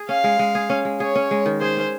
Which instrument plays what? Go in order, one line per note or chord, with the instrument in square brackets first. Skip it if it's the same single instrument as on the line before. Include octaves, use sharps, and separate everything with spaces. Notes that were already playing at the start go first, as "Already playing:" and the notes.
Already playing: [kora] G#4
[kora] C#4 [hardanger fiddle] F5
[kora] G#3
G#3
G#4
C#4
G#3
[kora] G#4 [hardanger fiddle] C#5
[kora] C#4
G#3
D#3
[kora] G#4 [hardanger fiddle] C5
[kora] C#4